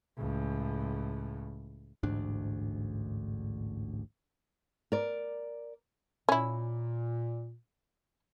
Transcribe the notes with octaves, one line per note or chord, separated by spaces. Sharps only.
C#2 A2
A1 D2 G#2 D4
A#4 D5
A#2 C#4 E4